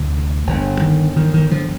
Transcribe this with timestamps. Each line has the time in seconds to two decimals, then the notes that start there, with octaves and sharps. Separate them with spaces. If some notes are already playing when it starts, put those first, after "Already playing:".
Already playing: D2 C3
0.47 G1 G2 D3
0.81 D#3
1.16 D#3
1.34 D#3
1.51 D3 F3